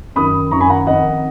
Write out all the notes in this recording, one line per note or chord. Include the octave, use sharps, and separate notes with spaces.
F#2 D#3 B5 D#6
F#2 D#3 A#5 C#6
G#5 B5
F#5 A#5
F2 D#3 D#5 F#5